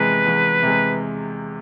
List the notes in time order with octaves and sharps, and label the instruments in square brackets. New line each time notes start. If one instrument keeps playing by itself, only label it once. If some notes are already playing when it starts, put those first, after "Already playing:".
Already playing: [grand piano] E2 C3 G#3 [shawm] B4
[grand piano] E2
C3 G#3